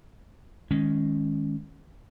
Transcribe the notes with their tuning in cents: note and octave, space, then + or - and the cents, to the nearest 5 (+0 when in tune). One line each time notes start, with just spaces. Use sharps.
D#3 +0 G#3 +0 C#4 +0